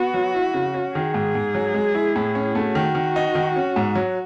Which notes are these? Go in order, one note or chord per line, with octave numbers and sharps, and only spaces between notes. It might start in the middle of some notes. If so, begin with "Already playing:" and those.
Already playing: B3 F#4
F#3
E4
C#3
C#4
D#3 G#4
G#2
G#2
F#3
G#3
E4
A2
C#4
A3 F#4
D#3
D#3
D#4
D#3
C#4
G#2
F#3